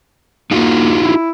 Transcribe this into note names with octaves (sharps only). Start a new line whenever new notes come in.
A#3 D#4 F4 F#4
E4